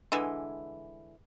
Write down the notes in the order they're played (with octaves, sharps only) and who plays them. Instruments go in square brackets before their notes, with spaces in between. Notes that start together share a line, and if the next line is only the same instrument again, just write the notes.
[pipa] D3 E3 G#3